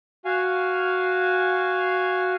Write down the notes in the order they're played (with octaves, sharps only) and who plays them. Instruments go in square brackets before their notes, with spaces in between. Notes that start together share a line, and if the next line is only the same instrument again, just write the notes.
[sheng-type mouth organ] F#4 F5 G#5